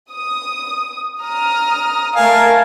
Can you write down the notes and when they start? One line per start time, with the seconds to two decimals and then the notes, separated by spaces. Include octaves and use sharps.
0.12 D#6
1.21 A#5 D#6 F6
2.16 A3 A#4 F5 G#5 A5